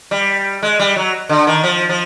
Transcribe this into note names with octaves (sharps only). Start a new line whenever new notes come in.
G3
G#3
G3
F#3
D3
D#3
F3
F3